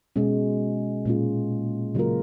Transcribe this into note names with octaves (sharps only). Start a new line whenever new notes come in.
B2 G#3 C#4
A#2 G#3 C#4 F4
C#3 F#3 A#3 F4 A#4